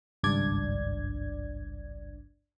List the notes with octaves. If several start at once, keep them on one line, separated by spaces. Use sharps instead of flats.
G#1 C#2 G2 D4 D5 G#6